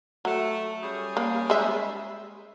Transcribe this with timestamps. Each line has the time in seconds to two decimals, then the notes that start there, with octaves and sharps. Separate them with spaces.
0.25 F#3 A3
0.82 G3 C#4 G#4
1.17 A#3
1.50 G#3 E5